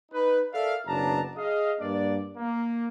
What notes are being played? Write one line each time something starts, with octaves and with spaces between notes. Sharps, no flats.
D#4 B4
A4 A#4 D5 E5 F5
F#1 B2 F#3 D4 A5 A#5
G#4 D#5 F5
G2 A#3 D4 D5
A#3